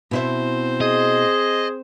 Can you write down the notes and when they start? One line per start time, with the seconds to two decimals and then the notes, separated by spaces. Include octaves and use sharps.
0.11 B2 C4 E4 C5 E5
0.81 G#4 D#5